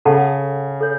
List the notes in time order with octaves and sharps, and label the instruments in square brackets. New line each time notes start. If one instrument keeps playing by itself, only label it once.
[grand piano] C#3 [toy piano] A4 F#5 A5
[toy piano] A4 C#5